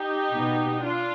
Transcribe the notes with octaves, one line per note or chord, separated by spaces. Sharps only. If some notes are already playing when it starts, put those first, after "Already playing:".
Already playing: D#4 G4
B2 B3
D4 F4